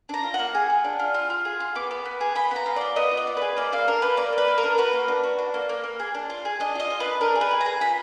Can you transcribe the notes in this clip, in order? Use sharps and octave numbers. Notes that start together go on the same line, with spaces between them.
D4 A#5
F4
F#5
A#3
G#4
F4
D4
F4
F4
F4
G#4
F4
B3 D6
B3
B3
G#4
F4 B5
B3 A#5
F4
F4 D5
B3 D#5
F4
D5
B3
G#4 B4
A#3 D5
A#3 F5
D4 A#4
A#3 B4
A#3 D5
A#3
B4
A#3
A#4
D4
F#4 B4
A#3
D4
F#4
D4
A#3
A#3
A#3
G#4
D4
F4
G#4
D4 D#5
F4 D#5
F4
D4 B4
D4 A#4
G#4
B4
G#4
A#5
G#4
F4 B5